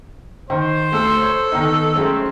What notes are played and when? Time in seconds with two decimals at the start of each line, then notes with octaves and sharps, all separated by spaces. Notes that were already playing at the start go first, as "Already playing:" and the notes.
0.50 D#3 C5
0.93 D2 A4
1.22 C#5
1.52 D#3 B3 D#4
1.95 F#3 G#3 A3 C4 C#4